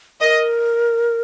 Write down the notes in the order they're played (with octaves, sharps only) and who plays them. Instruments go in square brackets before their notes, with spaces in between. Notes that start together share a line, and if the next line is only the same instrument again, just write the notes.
[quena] A#4 [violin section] D#5